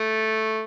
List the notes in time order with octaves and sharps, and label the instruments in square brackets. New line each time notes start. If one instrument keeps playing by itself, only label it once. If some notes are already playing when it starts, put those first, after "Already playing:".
Already playing: [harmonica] A3